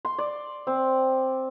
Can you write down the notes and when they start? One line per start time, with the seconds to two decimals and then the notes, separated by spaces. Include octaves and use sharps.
0.05 C6
0.18 D5
0.67 C4